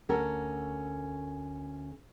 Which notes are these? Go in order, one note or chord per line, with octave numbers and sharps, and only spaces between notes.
D2 C#4 A4 A#4 F#5